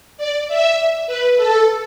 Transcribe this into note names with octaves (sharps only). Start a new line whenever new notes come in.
D5
E5
B4
A4